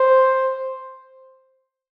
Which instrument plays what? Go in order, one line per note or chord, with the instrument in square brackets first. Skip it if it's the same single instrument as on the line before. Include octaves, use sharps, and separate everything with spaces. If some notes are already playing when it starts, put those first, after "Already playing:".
Already playing: [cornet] C5